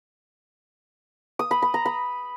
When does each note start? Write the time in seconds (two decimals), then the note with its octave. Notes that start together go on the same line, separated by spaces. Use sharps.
1.39 D#6
1.51 B5
1.62 B5
1.74 A#5
1.86 B5